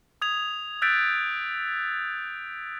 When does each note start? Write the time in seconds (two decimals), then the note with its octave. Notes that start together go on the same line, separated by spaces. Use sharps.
0.22 D#6 G#6 F7
0.82 E6 F#6 G6 A6 B6 D7